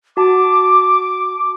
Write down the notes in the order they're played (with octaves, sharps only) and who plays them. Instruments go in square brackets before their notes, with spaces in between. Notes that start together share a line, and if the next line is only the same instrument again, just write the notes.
[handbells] F#4 A5 [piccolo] D6